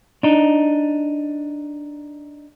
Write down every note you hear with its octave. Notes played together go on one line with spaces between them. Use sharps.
D4 D#4